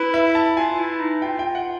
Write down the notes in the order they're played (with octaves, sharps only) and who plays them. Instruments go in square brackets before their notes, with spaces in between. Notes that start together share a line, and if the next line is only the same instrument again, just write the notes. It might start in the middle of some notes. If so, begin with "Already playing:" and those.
Already playing: [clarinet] E4 [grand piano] B4
[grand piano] E5
A5
[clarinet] F4 [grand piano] G#5
[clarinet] E4
D#4
[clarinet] F4 [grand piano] G5
[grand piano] G5
F#5